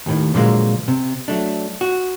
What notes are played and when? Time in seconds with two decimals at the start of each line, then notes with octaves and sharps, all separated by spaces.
0.06 D#2 A2 D#3
0.34 A#2 D3 F3 F#3 G#3 A#3
0.88 C3
1.28 F#3 A3 D4
1.81 F#4